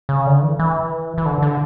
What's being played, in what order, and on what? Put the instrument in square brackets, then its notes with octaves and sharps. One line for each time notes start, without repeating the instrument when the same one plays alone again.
[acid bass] C#3
D3
E3
E3
E3
D3
D3